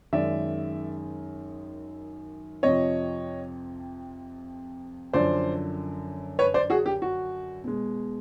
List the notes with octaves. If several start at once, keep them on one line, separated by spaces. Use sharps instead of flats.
F#2 D#3 G#3 D5 E5
F2 C3 F3 C#5 D#5
F#2 D3 F3 C5 D5
B4 C#5
C5 D5
F#4 G#4
G4
F#4
B2 G#3